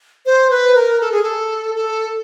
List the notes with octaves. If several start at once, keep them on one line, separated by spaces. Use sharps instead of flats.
C5
B4
A#4
A4
G#4
A4
A4